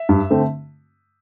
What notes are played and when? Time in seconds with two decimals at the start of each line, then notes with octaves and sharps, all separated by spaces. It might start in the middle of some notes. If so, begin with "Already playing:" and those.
Already playing: E5
0.09 G2
0.30 D3 A3 C4